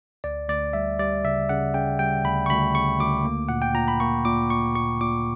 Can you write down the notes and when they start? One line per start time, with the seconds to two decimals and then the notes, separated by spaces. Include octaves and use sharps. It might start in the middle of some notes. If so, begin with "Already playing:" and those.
0.24 D2 D5
0.48 D2 D5
0.73 G3 E5
0.99 G3 D5
1.24 C#3 E5
1.49 C#3 F#5
1.74 C#3 G5
1.99 G3 G5
2.24 D2 B5
2.46 C#6
2.50 D2 B5
2.75 C#3 C#6
3.00 D2 D6
3.25 A#3
3.49 A#2 F#5
3.62 G5
3.75 A#2 A#5
3.88 B5
4.00 A#3 C#6
4.25 A#2 D6
4.50 A#2 C#6
4.75 A#2 C#6
5.01 A#2 D6